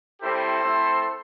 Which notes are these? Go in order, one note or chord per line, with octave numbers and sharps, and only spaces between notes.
G3 C4 E4 G4 A4 C5
A3 C4 E4